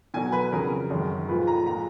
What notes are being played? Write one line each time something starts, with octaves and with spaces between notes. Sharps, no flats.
B2 F#3 G#5
B4
F2 C#3 F#3 A#4
F#2 D#3 G#3
A#2 F3 G#3 B4
A#5
A#2 G#3 A#5